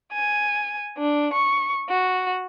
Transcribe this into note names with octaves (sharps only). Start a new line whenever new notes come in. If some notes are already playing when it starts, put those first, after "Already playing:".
G#5
D4
C#6
F#4